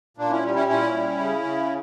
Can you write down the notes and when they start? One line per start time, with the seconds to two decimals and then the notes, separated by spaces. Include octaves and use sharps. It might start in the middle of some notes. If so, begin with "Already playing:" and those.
0.17 A#2 A#3 D4
0.30 C#4 E4
0.42 G3 C#4
0.55 C#4 E4
0.67 A#2 C#4 E4
0.94 G3
1.19 C#3
1.44 C#3